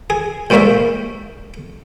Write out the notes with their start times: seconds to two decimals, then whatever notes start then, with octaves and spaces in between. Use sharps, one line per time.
0.10 G#4
0.50 A1 G#2 G3 A3 A#3 E5